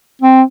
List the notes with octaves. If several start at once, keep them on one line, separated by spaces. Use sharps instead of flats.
C4